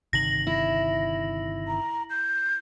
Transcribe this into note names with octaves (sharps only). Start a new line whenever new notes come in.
G1 C3 D#3 A#6 F#7
E4
A#5
G6